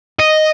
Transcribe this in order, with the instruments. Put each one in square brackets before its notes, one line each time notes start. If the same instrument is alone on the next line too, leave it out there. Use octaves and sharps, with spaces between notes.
[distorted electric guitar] D#5